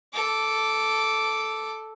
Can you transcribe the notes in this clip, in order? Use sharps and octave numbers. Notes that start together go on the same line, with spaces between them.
A4 D6